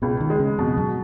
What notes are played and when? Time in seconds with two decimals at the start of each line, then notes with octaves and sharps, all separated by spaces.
0.02 C#2 B2
0.20 D#3
0.30 G#3
0.40 C#3
0.58 F2 B2
0.78 F#2